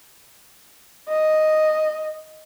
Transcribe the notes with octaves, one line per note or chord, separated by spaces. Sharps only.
D#5